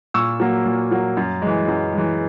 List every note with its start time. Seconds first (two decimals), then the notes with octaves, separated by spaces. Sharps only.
0.14 A#2 C#6 E6
0.40 F#3 A#3
0.66 A#2
0.91 F#3 A#3
1.17 F#2
1.42 E3 G#3
1.68 F#2
1.93 E3 G#3